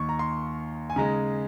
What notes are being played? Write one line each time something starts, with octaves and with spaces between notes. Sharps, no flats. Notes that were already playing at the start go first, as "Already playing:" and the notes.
Already playing: D#2 D#3 A#3 D#4 C#6
A#5
C6
G#5
C#3 G#3 D#4 A#5